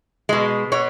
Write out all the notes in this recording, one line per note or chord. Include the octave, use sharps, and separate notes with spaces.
B2 G#3
B2 C#5